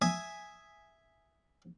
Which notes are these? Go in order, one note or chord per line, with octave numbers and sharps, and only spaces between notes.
E5 G#5 D#6